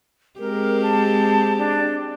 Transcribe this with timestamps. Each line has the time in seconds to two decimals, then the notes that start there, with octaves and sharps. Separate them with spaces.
0.39 G#3 C4 G4 A#4
0.82 A5
1.58 D4